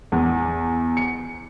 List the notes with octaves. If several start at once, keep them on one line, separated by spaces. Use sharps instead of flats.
E2
C#7